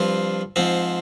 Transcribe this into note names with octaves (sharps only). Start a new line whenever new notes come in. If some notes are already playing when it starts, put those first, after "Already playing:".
Already playing: G2 F3 C4 F4
G#2 F3 C4